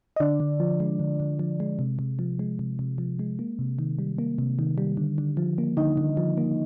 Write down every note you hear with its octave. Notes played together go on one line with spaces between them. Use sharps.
D#5
D3 D4 D5
D3
F3
G#3
D3
D3
F3
G#3
C3
C3
F3
G#3
C3
C3
F3
G#3
A#3
C3
D#3
G3
A#3
C3
D#3
G3
D3
D3
F3
A#3
D3 D#4 D#5
D3
F3
A#3